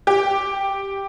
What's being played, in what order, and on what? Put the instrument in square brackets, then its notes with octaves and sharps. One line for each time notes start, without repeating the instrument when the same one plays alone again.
[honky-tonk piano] G4